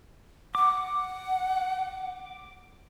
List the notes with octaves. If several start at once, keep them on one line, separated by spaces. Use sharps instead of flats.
F#5 D6